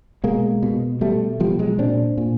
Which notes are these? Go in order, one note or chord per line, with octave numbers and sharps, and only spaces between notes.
B2 G#3 A#3
B2
B2 G3 A3
B2 F3 G3
F#3 G#3
A#2 C4 D4
A#2